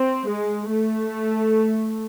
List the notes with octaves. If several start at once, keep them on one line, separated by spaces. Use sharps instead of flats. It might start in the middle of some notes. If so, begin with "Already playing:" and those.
Already playing: C4
G#3
A3